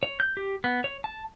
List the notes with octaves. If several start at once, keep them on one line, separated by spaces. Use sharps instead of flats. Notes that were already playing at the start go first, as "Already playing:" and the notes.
C#5
G6
G4
B3
C#5
A5